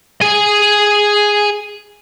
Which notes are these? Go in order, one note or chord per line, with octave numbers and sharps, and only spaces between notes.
G#4 G#5